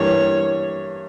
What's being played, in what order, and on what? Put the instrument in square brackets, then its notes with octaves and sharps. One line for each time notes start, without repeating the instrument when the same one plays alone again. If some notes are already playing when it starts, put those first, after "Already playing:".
Already playing: [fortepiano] G2 E3 A#3 [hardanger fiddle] C#5